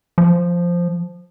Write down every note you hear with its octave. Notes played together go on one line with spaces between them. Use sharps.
F3